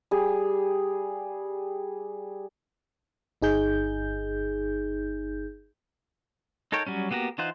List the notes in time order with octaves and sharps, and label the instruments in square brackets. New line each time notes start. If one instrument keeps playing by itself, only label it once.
[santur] G3 G#4
[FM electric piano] G1 D#4 G#4 G6
[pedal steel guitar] D#4 A4 A#4 C#5 G5
F#3 G3 C#4
A#3 B3 F#4 G4 A#4
E3 D#4 F4 C5 F#5